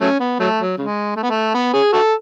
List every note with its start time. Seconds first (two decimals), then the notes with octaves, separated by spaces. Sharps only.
0.01 F#3 A3 C#4
0.20 B3
0.40 F#3 A3
0.59 F#3
0.78 C#3 G#3
1.16 A3
1.23 B3
1.30 A3
1.54 B3
1.74 C#4 G#4
1.93 F#4 A4